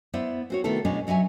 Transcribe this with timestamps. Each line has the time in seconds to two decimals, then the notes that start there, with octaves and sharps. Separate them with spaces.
0.13 B3 E4 C5 D5 E5
0.50 C4 F#4 C#5
0.64 C3 D#3 A3 B3 E4 A4
0.85 B2 G#3 B3 C#4 D4
1.07 B2 F#3 C#4 E5 G#5